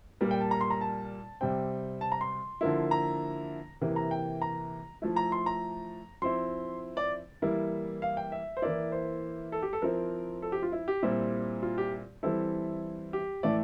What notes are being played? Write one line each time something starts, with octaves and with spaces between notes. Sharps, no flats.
A#2 G3 A#3 A#4
G5
A5
A#5
C6
A#5
A5
C3 G3 C4 G5
A5
A#5
C6
D3 F3 A#3 E4
A#5
C3 E3 A#3
A#5
G5
A#5
F3 A3 E4
A#5
C6
A#5
F3 C4 E4 C6
D5
E3 G3 A#3 E4
F5
G5
E5
C5
E3 A#3 E4 D5
C5
A4
G4
A4
F3 C4 E4 A#4
A4
G4
F4
E4
G4
A#2 G3 C4 E4
F4
G4
E3 G3 C4 E4 A4
G4
A2 E3 A3 D5